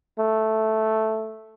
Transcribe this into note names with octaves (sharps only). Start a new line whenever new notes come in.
A3